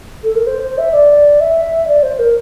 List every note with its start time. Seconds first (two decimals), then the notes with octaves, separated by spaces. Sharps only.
0.23 A4
0.35 A#4
0.46 C5
0.62 C5
0.78 E5
0.93 D5
1.40 E5
1.87 D5
2.02 C5
2.19 A#4